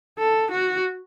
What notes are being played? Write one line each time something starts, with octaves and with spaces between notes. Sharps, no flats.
A4
F#4